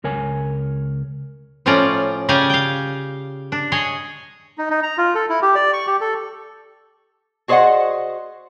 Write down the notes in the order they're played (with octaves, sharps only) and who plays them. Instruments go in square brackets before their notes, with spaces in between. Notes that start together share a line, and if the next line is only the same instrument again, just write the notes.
[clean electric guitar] C#2 A#4 C#5 G#5
[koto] A2 F3 C#4 F4 D5 A#5
C#3 G4 D5 F5 G#5 A#5
F5 G5
D4
G#4 C#5 D#5
[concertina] D#4
D#4
A#5
F4
A4
E4
G4
D5
C#6
G4
A4
[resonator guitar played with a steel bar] F#4 G#4 C5 D5 D#5 F#5